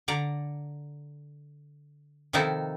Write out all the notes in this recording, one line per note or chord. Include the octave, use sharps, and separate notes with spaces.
D3 D5 A#5
C3 D#3 F3 D#4 E4 A4